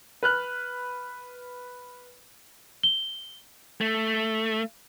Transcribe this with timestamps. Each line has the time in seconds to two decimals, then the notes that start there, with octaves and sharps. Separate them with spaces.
0.23 B4 F6 F#6
2.83 G7
3.81 A3